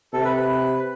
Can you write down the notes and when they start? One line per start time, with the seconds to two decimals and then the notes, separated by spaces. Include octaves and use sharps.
0.13 C3 A4
0.25 B4
0.36 B4